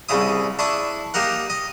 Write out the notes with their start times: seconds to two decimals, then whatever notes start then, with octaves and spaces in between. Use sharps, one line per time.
0.09 C2 C#3 E4 D#6
0.59 D4 E4 C#6 D#6
1.14 A#3 D#4 G4 A#4 F#5
1.50 D#5